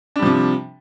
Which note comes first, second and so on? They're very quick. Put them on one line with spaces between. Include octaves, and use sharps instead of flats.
D4 G3 F3 C3